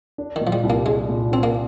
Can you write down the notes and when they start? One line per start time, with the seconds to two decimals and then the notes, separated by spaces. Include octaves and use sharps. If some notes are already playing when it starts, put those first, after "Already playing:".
0.18 D4
0.36 A#2 D#3
0.47 F3
0.52 G3
0.63 C2
0.70 A#3
0.86 G#3 D4
1.09 A#2
1.31 C4 D4
1.43 A#3